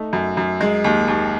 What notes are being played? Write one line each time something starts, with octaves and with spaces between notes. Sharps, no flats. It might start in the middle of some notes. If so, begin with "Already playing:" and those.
Already playing: A3 D#4
F#2
F#2
G#3
D#2
D#2